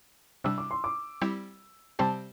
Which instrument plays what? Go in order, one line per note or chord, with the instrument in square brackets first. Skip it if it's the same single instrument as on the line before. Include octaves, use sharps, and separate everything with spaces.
[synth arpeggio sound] C3 G3 D4 [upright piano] E6
[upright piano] D6
C6
D6
[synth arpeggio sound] G3 C4 E4 G4
[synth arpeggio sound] C3 G3 C4 G4 C5 [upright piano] A5